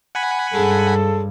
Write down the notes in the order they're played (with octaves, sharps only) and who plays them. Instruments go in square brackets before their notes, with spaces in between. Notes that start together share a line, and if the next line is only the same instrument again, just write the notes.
[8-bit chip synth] F#5 G#5 B5
[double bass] G2 [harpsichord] C#3 G#3 [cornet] A4